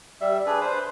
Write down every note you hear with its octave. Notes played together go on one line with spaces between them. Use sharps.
G3 E5
D4 G#4 B4
B4 C5